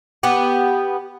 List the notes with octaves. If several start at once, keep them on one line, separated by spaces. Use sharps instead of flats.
B3 G4